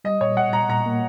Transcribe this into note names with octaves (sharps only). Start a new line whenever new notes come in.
G3 D#5
A#2 C#5
G3 F#5
A#2 A#5
A#2 A#5
A#3